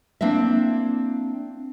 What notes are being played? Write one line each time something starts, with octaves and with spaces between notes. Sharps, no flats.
A#3 C4 D4 E4 E5